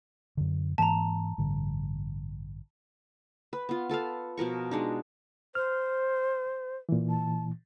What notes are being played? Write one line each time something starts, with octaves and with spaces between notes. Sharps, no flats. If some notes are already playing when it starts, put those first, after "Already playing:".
F#2 D3
G#2 E3 A#3 A5 A#5
A1 G2 D3
B4
B3 F4
F4 A4 B4 F5
B2 F3 A#4 C#6
G#3 D4 D#4
C5 F6
A#2 E3
A5